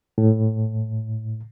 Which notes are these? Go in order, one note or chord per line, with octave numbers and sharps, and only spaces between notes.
A2